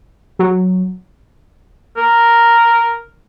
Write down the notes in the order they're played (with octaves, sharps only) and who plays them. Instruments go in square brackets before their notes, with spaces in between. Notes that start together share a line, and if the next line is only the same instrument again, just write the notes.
[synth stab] F#3
[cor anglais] A#4